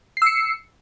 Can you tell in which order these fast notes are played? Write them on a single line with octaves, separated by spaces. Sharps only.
C7 E6 C#7